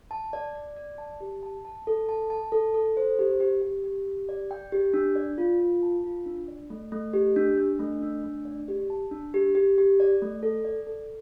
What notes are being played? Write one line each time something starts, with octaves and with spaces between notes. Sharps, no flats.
A5
D5
D5
D5
A5
G4
A5
A5
A4
A5
A5
A4
A4
C5
G4
G4
G4
G4
G4
D5
G5
G4
D4
D5
F4
F4
A5
F4
D4
D5
A3
A3
G4
D4
D4
A3
D4
A3
D5
G4
A5
D4
G4
G4
G4
D5
A3
A4
D5
A4